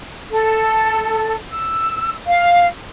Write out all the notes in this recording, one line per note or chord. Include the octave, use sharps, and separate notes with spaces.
A4
E6
F5